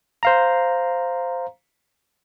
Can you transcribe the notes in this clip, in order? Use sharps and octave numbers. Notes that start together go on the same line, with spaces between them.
C5 F5 A#5